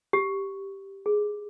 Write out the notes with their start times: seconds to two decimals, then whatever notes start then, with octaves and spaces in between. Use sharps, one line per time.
0.13 G4
1.06 G#4